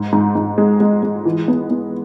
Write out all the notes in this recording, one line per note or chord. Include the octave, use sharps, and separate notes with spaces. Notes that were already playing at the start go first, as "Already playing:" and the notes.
Already playing: G#2
G#2
G#2
G#3
G#3
G#3
E3
B3
B3